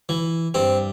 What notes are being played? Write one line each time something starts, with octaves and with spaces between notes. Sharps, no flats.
E3
G2 C4